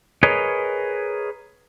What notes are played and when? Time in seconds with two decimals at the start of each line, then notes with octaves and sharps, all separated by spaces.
0.23 G#4 A#4 B4 C#5 D#5